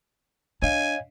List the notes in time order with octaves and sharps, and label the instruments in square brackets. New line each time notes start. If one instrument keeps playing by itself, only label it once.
[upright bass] D4 [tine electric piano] C#5 D#5 F5 [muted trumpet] G#5